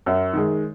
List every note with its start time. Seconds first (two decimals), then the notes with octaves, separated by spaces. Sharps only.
0.06 F#2
0.33 D#3 G#3